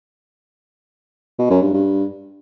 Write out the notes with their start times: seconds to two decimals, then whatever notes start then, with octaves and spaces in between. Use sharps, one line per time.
1.39 B2
1.50 F#2
1.62 G2
1.73 G2